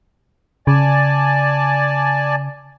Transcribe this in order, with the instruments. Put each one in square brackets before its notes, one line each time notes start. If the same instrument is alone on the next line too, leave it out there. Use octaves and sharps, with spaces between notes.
[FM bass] C#3 [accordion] D5 G#5 A5